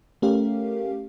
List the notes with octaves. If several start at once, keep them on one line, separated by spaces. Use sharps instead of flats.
A3 C#4 G4 A#4 F5